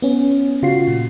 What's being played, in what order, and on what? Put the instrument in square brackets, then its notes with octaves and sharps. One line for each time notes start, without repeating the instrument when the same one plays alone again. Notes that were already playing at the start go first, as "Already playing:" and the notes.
[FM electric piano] B3 C#4
C#3 F4 F#4 C7
A#2